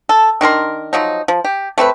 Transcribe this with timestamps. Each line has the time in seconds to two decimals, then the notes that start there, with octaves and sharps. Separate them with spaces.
0.09 A4
0.41 D#3 D4 A#4 C6
0.93 F3 F#3 D#4
1.28 F3
1.45 G4
1.78 A3 C4 F#4 B4